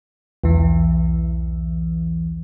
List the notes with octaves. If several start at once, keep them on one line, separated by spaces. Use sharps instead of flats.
B1 E2 E3